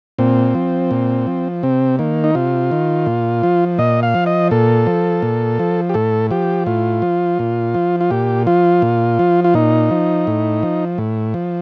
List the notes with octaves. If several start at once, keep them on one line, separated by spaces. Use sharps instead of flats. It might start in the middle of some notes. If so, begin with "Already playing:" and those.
A#2 C4
F3
A#2
F3
C3 C4
D#3 A#3
D#4
C3 F4
D#3
A#2
F3
A#2 D#5
F5
F3
D#5
A#2 A4
F3
A#2
F3
G4
A2 A4
F3 G4
A2 F4
F3
A#2
F3
F4
A#2 G4
F3 F4
A#2
F3
F4
A#2 D#4
F3
A2
F3
A2
F3